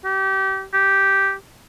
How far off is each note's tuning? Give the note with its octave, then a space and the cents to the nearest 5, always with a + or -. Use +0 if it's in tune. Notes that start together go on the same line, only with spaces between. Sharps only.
G4 -30
G4 -5